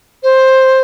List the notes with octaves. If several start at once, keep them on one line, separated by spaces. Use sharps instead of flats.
C5